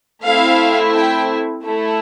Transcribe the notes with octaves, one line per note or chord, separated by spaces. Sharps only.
A3 C4 E4 F5
G5
A3 E4 A4